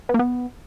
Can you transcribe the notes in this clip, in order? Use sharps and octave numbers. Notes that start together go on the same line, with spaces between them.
B3
A#3
B3